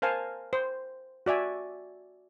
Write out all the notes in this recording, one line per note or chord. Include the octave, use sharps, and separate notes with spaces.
A#4 C5 F5 G#5 A5
C5
F#4 D5 E5 G#5